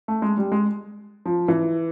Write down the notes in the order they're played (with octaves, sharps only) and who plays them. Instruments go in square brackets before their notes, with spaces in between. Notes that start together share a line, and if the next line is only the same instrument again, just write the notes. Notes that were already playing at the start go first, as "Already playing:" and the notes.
[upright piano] A3
G#3
G3
G#3
F3
E3